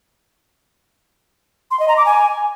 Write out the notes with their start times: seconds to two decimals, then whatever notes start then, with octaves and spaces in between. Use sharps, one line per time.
1.71 C6
1.79 D#5
1.88 A#5
1.97 D6
2.05 G#5